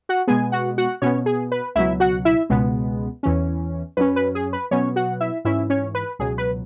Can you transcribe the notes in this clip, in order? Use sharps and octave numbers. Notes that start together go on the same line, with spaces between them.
F#4 F#5
B2 G#3 B3 G#4 G#5
F#4 F#5
F#4 F#5
B2 B3 C#4 C#5
G#4
B4
C#2 B2 F#3 E4 E5
F#4 F#5
E4 E5
C#2 B2 G#3 B3
E2 E3 C#4
F#2 F#3 C#4 B4
B4
G#4
B4
B2 F#3 B3 C#4 C#5
F#4 F#5
E4 E5
G#2 E3 C#4 E4 E5
C#4 C#5
B4
C#2 B2 F#3 G#4
B4